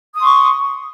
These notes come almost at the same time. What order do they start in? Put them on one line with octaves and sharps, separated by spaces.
D#6 C6 C#6